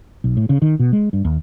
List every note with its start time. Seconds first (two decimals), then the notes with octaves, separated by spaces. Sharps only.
0.24 B1
0.37 A2
0.49 C#3
0.62 D#3
0.79 B2
0.93 G#3
1.13 G2
1.25 D#2